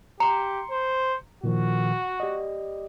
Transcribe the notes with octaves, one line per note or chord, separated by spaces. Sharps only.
G4 A#5 C6 C#7
C5
A#2 D#3 F3 F#4
G4 D5 D#5